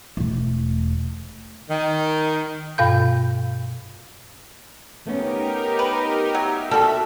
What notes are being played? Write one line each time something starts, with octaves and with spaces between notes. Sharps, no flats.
E1 A3
D#3
G2 B2 F5 B5 G6
A3 B3 C#4 D#4 G4 A#4
B4
F#3 E5
G3 F#4 A4